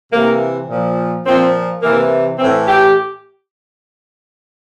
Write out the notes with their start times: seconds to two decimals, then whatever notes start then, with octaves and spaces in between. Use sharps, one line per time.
0.12 C3 E3 A#3
0.69 A#2 F3
1.25 A#2 F3 C4
1.82 C3 E3 A#3
2.38 A2 E3 C4
2.67 G4